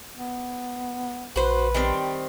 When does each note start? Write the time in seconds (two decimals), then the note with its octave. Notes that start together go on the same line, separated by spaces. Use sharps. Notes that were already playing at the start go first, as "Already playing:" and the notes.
0.16 B3
1.36 A#1 F#4 B4 C5
1.75 D#3 G3 C4